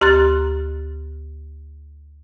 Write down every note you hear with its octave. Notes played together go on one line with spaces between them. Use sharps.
D2 G4 A#5 C6 F#6 A6